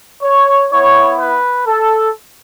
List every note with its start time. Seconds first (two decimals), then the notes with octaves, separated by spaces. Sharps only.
0.22 C#5
0.70 B3 E4 C#5
1.18 B4
1.67 A4